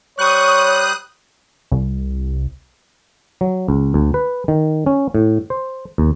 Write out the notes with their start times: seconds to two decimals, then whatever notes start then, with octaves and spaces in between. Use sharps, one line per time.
0.19 G3 C5 C#5 C#6 D#6 F#6
1.72 C2
3.41 F#3
3.68 C#2
3.94 D2
4.14 B4
4.48 D#3
4.86 C#4
5.15 A2
5.50 C5
5.98 D#2